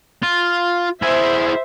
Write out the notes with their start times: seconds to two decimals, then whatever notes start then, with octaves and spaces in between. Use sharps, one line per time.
0.23 F4
1.02 E4 G#4 C5 E5